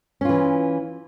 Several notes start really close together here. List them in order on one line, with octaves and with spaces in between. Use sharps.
C#4 F4 E3